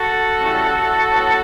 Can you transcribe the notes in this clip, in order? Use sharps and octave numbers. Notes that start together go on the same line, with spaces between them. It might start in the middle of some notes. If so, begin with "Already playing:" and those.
Already playing: F#4 A4
C#3 G3 C#4 E4
A2 F#3 B3